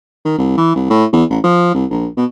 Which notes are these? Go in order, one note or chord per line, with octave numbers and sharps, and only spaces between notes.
D#3
C2
E3
C2
A2
E2
A1
F3
C2
A#1
B2